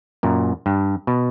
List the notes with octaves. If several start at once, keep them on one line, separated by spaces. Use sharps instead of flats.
F#2 A#2
G2
B2